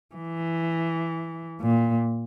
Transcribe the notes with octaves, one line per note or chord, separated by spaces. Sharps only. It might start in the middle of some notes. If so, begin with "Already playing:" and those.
E3
A#2